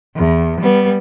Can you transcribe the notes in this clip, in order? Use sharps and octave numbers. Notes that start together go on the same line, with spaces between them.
E2
G3 B3